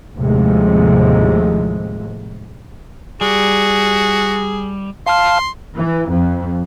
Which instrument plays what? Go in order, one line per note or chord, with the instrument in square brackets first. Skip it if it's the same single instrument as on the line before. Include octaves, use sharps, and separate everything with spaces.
[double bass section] D#2 A2 C3 F3 G#3
[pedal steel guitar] G3 [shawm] F#4 [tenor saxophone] G#4
[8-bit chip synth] F5 A5 F6 [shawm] C6
[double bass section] E3
F2